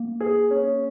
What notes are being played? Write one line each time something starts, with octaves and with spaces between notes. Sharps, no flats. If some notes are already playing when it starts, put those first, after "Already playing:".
Already playing: A#3
G#4
C#4